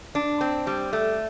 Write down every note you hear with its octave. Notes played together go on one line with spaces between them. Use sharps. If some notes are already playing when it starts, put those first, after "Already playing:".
D4
C4
G3
A3